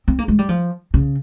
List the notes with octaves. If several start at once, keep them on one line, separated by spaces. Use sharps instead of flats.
C4
A#3
G#3
G3
F3
C#3